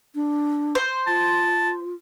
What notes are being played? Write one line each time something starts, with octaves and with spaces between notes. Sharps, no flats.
D4
C5
F4 A5